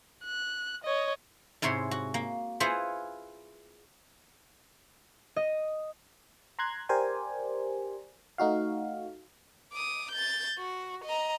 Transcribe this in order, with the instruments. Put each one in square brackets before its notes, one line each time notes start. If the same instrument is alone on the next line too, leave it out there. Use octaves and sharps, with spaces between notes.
[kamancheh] F#6
C#5 D#5
[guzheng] G#2 C3 E4 C#5 C6
F#4
A#3
E4 F4 G#4 B4 C5 F#5
[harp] D#5
[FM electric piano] A#5 C6 F#6 G#6
G4 A#4 C5 D5 G#5
A3 D#4 F#4 F5
[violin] D6 D#6
G6 A6
F#4
D#5 A#5